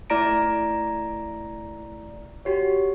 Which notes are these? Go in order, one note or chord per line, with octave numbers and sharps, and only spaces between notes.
A3 E4 D5 A#5 A#6 D7
F#4 G4 C#5